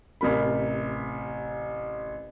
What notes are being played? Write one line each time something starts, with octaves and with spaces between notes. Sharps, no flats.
A1 C3 A#4 B5